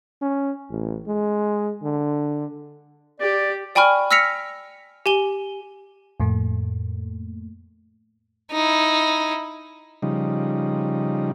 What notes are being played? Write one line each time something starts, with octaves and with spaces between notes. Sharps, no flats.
C#4
A1
G#3
D3
G4 D5
D5 G5 G#5 B5 C#6 F6
E6 F6 A#6 B6 C#7 F7
G4 G#5 G7
F2 A2 A3 A#3
D#4 E4
C#3 F3 G3 D#4